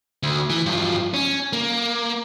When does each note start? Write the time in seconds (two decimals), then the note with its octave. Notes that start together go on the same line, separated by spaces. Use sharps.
0.23 D2
0.50 E3
0.66 G2 F3
1.14 C#4
1.53 A#3